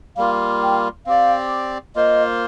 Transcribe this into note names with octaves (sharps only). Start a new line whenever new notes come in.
G3 A#3 F4 F5
G5
C4 G4 D5 F5
A#3 F4 C5 D#5